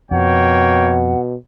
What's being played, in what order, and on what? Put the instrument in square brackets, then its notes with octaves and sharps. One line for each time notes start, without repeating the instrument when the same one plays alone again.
[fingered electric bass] F2 [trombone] B2 [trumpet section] A#3 C#5 G5 [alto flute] F#5